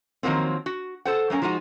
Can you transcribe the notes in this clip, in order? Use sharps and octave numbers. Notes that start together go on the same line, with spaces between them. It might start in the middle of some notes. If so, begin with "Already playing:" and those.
D#3 F3 F#3 A#3 C4
F#4
A4 C5 F#5
F#3 A#3 B3 C#4
F3 G#3 D#4 F4 F#4